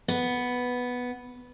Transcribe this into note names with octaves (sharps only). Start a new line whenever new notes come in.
B3